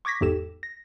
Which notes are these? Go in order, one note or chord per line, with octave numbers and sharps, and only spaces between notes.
C#6 D6 G#6 A#6 B6
G#1 E2 G#2 G4 A4 E7
A#6